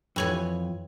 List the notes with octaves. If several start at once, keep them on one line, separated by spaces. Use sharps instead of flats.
F2 E3 C#5 G#5